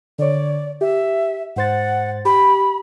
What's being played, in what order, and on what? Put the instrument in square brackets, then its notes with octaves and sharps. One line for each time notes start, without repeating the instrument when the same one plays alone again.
[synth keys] D3 C#5 [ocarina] D5
[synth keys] G4 [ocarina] E5
[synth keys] G#2 C5 A6 [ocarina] F#5
[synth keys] G4 [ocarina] B5